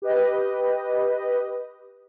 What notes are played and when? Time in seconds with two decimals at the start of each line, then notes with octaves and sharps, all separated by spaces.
0.02 G4 B4 D#5